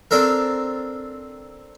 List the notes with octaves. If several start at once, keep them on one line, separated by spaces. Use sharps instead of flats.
C4 D4 A4 A#4